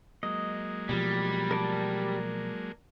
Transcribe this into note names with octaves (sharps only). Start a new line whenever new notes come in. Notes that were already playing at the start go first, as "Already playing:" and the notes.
F#3 G#3 A#3 D#5
B2 F3 G3
A#4 D5 A5